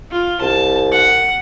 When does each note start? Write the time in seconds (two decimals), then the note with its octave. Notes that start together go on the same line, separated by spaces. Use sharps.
0.11 F4
0.41 C2 A5
0.92 F#5